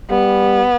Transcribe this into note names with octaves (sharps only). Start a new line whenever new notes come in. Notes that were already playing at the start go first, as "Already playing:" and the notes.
G3 B3